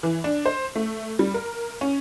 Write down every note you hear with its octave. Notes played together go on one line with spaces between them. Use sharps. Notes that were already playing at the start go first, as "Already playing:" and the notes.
E3
D4
C5
A3
G3
A#4
C#4